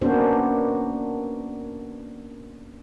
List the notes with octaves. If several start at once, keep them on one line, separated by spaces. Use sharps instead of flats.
A#3 B3 C#4 D4 F#4 C5